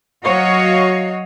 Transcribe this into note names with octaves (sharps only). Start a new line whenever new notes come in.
F#3 F#4 C#5 D#5 F5